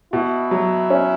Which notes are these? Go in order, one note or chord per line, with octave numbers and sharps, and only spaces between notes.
B2 E4
F#3
C#4